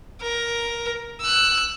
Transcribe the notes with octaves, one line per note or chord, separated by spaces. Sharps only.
A#4
E6 F#6